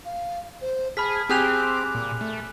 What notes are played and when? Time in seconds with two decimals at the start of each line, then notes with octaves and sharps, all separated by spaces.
0.05 F5
0.62 C5
0.97 G#4 A5 B5 F6 B6
1.29 C4 G4 G#4 G#5 D6 F#6 F7
1.95 A#2
2.21 A3